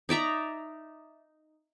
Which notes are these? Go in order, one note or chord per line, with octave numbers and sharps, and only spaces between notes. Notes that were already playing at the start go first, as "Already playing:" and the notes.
D#4 D5 E5 A#5